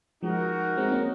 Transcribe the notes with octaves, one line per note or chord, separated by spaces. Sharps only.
F3 G#3 D#4 F#4 A#4
G#3 C4
A#3 C#4